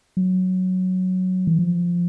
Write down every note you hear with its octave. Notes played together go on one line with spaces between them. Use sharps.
F#3
E3
F3